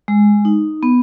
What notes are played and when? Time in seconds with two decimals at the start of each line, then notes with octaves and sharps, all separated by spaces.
0.08 G#3
0.45 D#4
0.83 B3